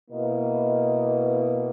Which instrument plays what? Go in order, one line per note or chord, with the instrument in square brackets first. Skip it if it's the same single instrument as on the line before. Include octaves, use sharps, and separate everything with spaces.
[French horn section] B2 A#3 E4 B4 D#5